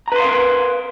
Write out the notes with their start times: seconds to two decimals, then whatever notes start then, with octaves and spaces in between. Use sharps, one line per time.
0.08 A#5
0.12 B4
0.16 C6
0.20 F5
0.24 A#4